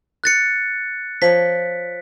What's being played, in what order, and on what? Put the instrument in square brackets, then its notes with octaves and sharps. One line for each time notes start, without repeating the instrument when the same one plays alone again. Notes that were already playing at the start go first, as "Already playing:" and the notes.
[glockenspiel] F#6 A6 C#7
[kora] F3 C#5 [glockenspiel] B6